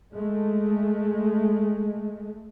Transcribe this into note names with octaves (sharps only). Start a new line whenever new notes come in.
G#3 A3